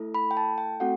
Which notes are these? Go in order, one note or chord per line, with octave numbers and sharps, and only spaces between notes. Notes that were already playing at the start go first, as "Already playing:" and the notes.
Already playing: A3 E4 A4
B5
G5
A5
G5
A3 C4 F#4 A4 F#5